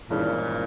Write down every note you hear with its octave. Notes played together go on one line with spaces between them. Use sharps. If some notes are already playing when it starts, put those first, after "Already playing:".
G#1 G2 A#2 E3 G#3 C#4